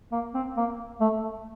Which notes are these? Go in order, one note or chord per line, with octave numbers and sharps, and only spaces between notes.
A#3
C4
A#3
A3